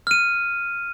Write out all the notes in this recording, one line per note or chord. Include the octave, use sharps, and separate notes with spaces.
F6 D#7